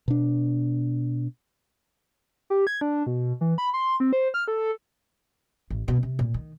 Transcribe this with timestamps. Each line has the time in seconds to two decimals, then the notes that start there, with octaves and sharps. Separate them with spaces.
0.08 B2 D4
2.50 G4
2.67 G#6
2.81 D4
3.07 B2
3.41 E3
3.58 B5
3.74 C6
4.00 C4
4.13 C5
4.34 F6
4.48 A4
5.70 A1
5.88 B2
6.03 C3
6.19 A#2
6.34 D#3